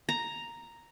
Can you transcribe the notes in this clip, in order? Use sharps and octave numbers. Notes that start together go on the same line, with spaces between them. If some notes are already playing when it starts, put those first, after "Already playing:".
A#5